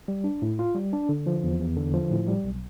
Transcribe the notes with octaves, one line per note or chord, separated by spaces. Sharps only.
G3
D4
A2
F4
G3
D4
D3
F3
E2
E2
D3
F3
A2
G3
B1